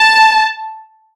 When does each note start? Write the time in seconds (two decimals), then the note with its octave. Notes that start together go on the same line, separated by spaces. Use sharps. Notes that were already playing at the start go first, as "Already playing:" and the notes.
Already playing: A5